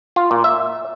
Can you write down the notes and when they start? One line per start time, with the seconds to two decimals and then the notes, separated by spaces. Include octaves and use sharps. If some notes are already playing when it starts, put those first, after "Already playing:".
0.16 F4
0.31 A#2
0.44 E5